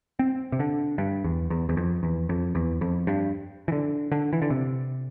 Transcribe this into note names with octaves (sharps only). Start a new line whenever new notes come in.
C4
C3
D3
G2
E2
E2
E2
F2
E2
F2
E2
F2
G2
E3
D3
D3
E3
D3
C3